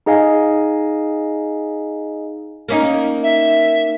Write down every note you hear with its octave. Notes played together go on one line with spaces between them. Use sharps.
D#4 G#4 D#5 F5 G#5
A#3 C#4 D#4
E5